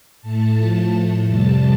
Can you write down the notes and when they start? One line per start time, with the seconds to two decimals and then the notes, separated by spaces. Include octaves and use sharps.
0.21 A2 A3 A5
0.56 A2 F3 A3
0.90 A2 A3
1.24 F2 C3 G3 A5